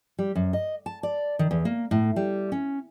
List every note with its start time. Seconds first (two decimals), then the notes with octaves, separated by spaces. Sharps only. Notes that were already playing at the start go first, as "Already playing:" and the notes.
0.18 G3
0.35 F#2
0.53 D#5
0.86 A5
1.03 D5
1.39 D#3
1.51 E2
1.65 A#3
1.91 A2
2.16 G3
2.52 C#4